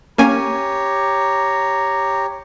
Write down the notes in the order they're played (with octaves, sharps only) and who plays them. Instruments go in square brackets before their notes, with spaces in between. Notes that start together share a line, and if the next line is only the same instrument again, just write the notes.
[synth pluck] A#3 C#4 G#5 [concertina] G4 C#5 [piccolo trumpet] A#5